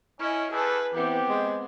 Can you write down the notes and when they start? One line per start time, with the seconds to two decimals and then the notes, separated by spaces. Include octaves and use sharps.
0.19 C#4 E4 D#5
0.50 E2 G#4 A4 B4
0.94 E3 B3 C4 G4
1.29 G#3